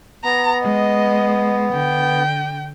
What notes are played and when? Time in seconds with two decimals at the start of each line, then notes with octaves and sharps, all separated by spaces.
0.24 B3 A#5
0.64 G#3 D#5
1.73 D3 G5